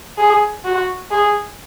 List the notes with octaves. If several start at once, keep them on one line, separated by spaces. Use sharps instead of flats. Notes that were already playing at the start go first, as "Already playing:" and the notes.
G#4
F#4
G#4